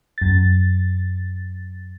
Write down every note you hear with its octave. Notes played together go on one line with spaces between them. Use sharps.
F#2 A6